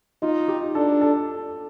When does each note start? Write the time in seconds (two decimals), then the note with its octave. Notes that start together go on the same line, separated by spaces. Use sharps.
0.22 D#4 F4
0.48 G4
0.75 D4 A4
1.01 A4